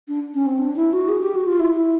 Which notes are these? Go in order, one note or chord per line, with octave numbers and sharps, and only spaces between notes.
D4
C#4
C4
D4
E4
F#4
G#4
G4
F#4
F4
E4